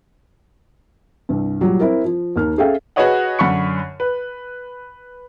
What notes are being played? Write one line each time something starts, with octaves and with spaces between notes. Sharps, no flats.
C2 G2
A#2 F#3 G3
C4 E4 A#4
F3
D#2 A#3 F6
C#4 G#4 A4 E5 F5 G5
F#4 G#4 B4 C#5 D#5 F#5
F#2 D3 B5 C#6 C#7
B4